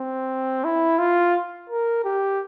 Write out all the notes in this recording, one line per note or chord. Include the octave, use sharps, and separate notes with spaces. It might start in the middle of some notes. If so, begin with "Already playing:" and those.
Already playing: C4
E4
F4
A#4
G4